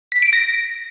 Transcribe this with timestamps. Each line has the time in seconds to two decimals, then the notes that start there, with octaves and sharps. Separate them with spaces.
0.12 B6
0.22 D7
0.33 A#6